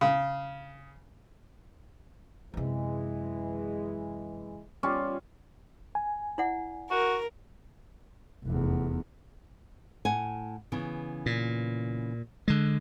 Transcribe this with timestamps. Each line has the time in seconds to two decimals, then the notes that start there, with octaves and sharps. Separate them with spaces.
0.01 C#3
2.54 F#2 C3 E3 G#3
4.83 G3 C#4 F4
5.95 G#5
6.38 E4 D5 F#5
6.91 F#4 A#4
8.45 F1 E2
10.05 A2 F#5 G#5
10.72 C#3 E3 B3
11.26 A#2
12.48 D3 G#3